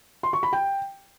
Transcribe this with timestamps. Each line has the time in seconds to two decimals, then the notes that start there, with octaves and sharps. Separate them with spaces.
0.23 C6
0.33 C#6
0.43 B5
0.53 G5